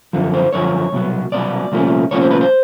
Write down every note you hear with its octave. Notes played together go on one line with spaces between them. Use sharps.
F#2 D3 F3
C5
F#2 D3 F3 C#5
C2 B2 F#3
C2 B2 F#3 D5
C2 A#2 F3 A3 C#4
C2 A#2 F3 A3 C#4 C#5
C5
B4
C5